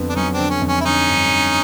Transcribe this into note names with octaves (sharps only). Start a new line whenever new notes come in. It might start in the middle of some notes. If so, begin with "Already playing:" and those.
Already playing: F2 D3 B3
D4
F#3 C#4 D#4
C4 D4
D3
C#4
F2
C#4
E4
D3 C#4 D#4
G2
G2